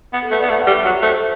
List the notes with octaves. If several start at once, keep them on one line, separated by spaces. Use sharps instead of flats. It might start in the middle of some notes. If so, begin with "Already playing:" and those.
B3
A4
A3 B4
B3 D5
A3 E5
F#5
G3
E5
F#3 F#5
E5
A3 C5
A4